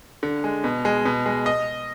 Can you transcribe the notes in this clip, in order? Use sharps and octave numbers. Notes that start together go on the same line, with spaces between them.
D3
G#3
B2
G#3
B2
G#3
D#5